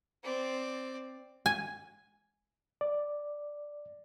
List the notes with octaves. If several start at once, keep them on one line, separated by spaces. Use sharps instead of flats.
C4 D5
G#5
D5